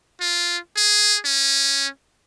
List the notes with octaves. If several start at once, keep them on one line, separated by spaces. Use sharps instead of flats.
F4
G#4
C#4